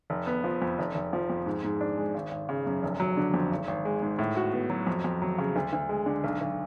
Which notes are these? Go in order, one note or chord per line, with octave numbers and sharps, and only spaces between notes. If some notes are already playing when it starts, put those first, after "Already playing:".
F1
B3
F3
F2
F1
F1
F3
F2
G#2
G#2
D4
G#3
G#1
G#1
C#3
F#2
F1
F#3
D3
F2
G#1
G#1
G#3
G#2
A2
F#4
B3
F#3
F2
F2
F#3
C#3
D2
D2
G#3
D3
B1
B1